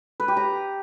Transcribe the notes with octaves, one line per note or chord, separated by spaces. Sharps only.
B4
G4
A#5